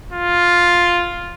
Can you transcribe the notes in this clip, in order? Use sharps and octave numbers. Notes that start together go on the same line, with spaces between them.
F4